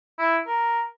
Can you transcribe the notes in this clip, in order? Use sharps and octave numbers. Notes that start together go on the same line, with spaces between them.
E4
A#4